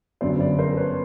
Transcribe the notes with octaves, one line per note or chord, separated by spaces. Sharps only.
G1 F#2 D3 F#3 B3 C5 D5
C#5
C5 D5
A#4 C5
B4 C#5